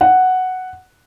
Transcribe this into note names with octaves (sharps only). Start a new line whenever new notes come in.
F#5